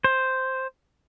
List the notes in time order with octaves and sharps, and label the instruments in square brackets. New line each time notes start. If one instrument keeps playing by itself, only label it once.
[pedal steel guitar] C5